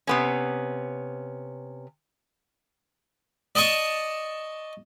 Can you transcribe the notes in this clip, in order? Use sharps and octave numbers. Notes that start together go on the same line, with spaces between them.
C3 B3 C#4
D5 D#5 A5 C#6 D#6